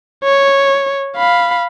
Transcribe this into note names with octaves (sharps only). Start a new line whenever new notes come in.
C#5
F5 B5